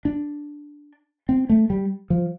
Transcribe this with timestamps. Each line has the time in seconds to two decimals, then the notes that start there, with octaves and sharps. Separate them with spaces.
0.05 D4
1.29 C4
1.49 A3
1.70 G3
2.10 F3